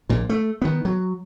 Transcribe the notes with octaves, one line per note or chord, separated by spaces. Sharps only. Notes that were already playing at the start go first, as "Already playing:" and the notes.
A#1 A#2
A3
D#3 B3
F#3